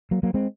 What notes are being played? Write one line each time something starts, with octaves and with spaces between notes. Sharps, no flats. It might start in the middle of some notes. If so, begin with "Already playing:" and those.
F#3 A#3
F#3 A#3
G#3 C4